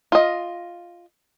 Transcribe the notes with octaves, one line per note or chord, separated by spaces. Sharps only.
F4 D#5